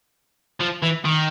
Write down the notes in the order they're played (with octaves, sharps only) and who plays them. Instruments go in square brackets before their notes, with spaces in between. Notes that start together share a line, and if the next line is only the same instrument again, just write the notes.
[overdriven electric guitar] F3
E3
D#3